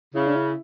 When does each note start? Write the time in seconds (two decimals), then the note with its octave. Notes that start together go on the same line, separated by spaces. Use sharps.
0.14 C#3 E4
0.27 D4
0.36 E4